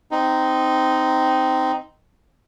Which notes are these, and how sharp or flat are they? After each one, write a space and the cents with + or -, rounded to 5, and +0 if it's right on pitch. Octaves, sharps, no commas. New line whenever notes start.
C4 -15 D#4 +0